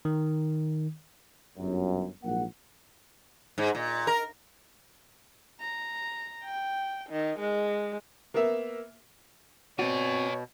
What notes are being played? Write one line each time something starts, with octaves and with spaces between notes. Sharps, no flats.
D#3
G1 F#2
A#1 G#2 F#3 A#3 F#5
G#2
A#2
A#4
A#5
G5
D#3
G#3
A#3 B3 A#4 E5
B2 C4 F#4 C#5 D5 G#5